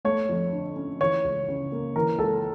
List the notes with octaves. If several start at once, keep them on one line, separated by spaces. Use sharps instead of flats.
A3 C#5
F2
D3
C#4
E3 C#5
C#2
C#3
A#3
E3 A#4
C#2 A4